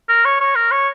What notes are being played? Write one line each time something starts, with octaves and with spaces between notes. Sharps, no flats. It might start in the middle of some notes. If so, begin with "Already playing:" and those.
A#4
C#5
C#5
A#4
C#5